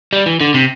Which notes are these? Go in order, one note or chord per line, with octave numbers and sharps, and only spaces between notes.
G3
E3
D3
C3